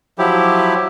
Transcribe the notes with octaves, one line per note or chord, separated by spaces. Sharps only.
F3 F#3 E4 G4